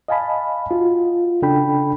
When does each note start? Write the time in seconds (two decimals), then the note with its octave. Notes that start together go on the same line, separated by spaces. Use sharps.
0.08 D#5 F5 G#5 A5 B5
0.71 F4 F#4
1.42 C#3 D4 A4 G5 B5